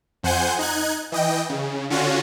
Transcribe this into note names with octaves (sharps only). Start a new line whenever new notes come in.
F2 C5 F#5 G#5 G6
D#4 F#6 G#6
E3 D#5 G5
C#3
D3 C#4 F4 F#4